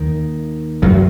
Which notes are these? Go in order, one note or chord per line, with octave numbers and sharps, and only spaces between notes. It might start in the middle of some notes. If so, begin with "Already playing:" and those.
Already playing: D#2 D#3
F#2 F#3